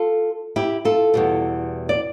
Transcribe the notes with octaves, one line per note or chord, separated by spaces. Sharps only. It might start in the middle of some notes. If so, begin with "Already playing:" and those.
Already playing: F4 A4
E4 G4
F4 A4
E2 B2 G3
D5